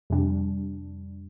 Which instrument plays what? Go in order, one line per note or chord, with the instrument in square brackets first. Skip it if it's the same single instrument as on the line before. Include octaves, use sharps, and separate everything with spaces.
[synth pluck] F2 C3 G3 D4